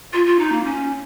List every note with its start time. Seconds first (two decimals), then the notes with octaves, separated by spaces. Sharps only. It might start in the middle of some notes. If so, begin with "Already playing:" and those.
0.13 F4
0.26 F4
0.39 D#4
0.52 A#3
0.65 C#4